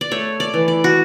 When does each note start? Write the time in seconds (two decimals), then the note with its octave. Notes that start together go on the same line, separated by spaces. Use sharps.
0.01 D5
0.11 A3 C#5
0.40 D5
0.54 E3
0.68 D5
0.84 F#4